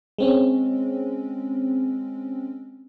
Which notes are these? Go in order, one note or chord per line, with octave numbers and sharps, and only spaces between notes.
G#3 C4 C#4